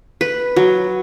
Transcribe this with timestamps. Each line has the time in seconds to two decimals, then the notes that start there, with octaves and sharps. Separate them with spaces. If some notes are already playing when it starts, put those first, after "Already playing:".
0.21 B4
0.56 F#3